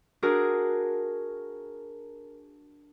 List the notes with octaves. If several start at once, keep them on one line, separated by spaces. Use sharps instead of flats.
D4 F#4 G#4 A#4